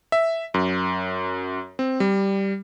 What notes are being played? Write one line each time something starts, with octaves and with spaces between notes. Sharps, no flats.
E5
F#2
C4
G3